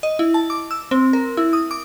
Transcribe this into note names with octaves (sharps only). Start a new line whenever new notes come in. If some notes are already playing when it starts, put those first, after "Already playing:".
D#5
E4
A5
D6
E6
C4
A#4
E4
D#6
D6